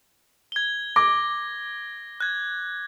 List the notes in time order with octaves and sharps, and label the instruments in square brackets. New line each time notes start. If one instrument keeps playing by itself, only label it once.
[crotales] G#6 G7
[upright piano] D6 [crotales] G#6 A#6
[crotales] F#6 G#6